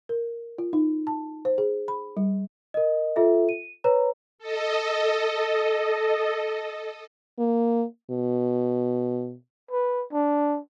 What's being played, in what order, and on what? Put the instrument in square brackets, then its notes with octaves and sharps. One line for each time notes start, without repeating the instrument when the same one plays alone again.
[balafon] A#4
F4
D#4
A5
C5
G#4
B5
G3
[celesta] A#4 D#5
F4 A4 E5
D#7
B4 C#5 A#5
[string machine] A4 D#5
[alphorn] A#3
B2
[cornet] B4
D4